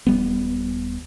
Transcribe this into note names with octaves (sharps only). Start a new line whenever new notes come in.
D#1 G3 B3